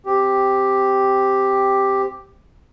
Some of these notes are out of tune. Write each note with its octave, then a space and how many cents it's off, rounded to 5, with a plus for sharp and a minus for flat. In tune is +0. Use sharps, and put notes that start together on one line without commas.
C4 -5 G4 +0